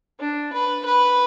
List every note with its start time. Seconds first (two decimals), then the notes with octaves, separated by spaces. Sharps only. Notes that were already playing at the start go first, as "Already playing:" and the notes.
0.20 D4
0.53 B4
0.86 B4